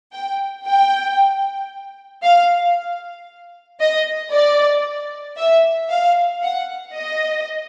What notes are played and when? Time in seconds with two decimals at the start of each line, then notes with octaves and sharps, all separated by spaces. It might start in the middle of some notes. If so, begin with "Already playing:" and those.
0.13 G5
0.66 G5
2.23 F5
3.81 D#5
4.33 D5
5.37 E5
5.90 F5
6.42 F#5
6.96 D#5